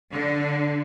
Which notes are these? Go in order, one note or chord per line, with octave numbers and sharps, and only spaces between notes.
D3